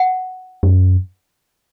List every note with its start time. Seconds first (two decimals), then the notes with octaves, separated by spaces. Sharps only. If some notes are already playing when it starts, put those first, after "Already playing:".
Already playing: F#5
0.63 F#2